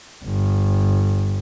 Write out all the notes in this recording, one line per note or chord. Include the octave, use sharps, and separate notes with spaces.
G1